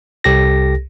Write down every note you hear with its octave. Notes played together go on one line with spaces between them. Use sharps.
C2 G4 A4 A#6